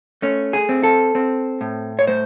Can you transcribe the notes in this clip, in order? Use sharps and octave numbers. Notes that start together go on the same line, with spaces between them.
A3 C#4
G#4
C4
A4
C4
A2
C#5
A3 C5